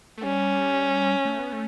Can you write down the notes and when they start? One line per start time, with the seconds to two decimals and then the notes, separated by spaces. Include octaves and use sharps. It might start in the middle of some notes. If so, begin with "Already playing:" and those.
0.18 A3
0.24 G3 C#4
1.25 A3
1.39 B3
1.53 A3